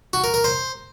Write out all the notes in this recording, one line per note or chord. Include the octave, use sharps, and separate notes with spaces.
F#4
A#4
A#4
C5